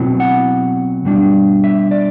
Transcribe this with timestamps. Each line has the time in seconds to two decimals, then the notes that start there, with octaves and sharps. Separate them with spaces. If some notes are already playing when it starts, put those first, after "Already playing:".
Already playing: B2 F#3 C4 E4
0.20 F#5
1.05 B2 G3 D4
1.64 E5
1.91 D5